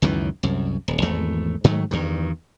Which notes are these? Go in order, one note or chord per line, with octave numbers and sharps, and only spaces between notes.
C#2 F#2 D#3 E3
C2 F#2
D#1
G#1 E2 A3
G#2 D#3 F#3 A3
E2 G2 D#3